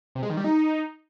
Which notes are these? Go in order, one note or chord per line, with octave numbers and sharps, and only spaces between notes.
C3
G#3
D#3
G3
D#4